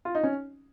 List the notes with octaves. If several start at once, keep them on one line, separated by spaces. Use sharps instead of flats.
F4
D#4
C#4